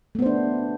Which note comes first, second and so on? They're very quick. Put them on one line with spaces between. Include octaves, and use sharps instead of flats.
A3 B3 C5 D4